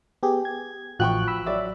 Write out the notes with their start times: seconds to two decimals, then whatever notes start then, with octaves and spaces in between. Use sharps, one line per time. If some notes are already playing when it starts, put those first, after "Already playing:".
0.23 B3 G4 G#4
0.45 G#6
0.99 A1 F3 F#4 G5 C#6 F#6
1.28 B5 E6
1.46 F#3 D5 E5